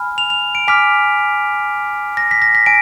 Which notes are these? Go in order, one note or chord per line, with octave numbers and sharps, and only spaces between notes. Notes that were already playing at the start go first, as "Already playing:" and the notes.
Already playing: G#5 B5 F6
F7
F7
D7
G#5 D6 F6 B6
A#6
B6
A#6
B6
G#5 D7